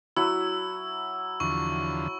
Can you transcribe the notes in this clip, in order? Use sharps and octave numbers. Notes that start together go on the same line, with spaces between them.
F#3 E4 F#4 E6
E2 D3 F3 C#6